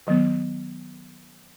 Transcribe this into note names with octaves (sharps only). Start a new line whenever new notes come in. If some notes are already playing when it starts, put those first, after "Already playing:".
D#3 F#3 B3